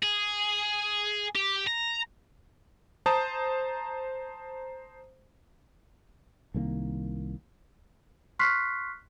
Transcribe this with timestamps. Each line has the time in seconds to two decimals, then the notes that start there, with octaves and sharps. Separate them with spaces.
0.03 G#4
1.36 G4
1.67 A#5
3.06 C5 A5 A#5 D#6
6.54 C2 D#3 G3 A#3
8.39 C6 C#6 F6 F#6 B6 C7